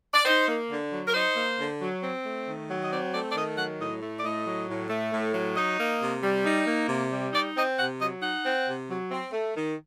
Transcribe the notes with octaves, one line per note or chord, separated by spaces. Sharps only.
D5
D#4 C5
A#3
D3
F#3
A#4
D#4 C5
A#3
D3
F#3
C4
A3
D#3
F#3
D#5
C4 D5
A3 D5
D5
D#3 D#5
F#3 F#5
A2 D#5
A3
D5
A2 D#5
F#3
A2
A3
A2
F#3
D#4 D#5
A#3
C3
G3
D#4
A#3
C3
G3
D#4 D5
C4 D#5
C3 F#5
F#3 D#5
D#4 F#5
C4
C3
F#3
C4
A3
D#3